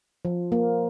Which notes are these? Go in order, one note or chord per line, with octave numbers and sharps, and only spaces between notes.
F3
A#3